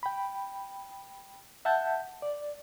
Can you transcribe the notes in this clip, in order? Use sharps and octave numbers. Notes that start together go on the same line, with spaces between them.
G5 B5
E5 F#5 A5 G6
D5